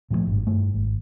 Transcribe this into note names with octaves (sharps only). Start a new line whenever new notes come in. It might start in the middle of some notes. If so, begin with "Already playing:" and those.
A#2 F3 F#3 A3
G#1 G2
G2 A3
G#1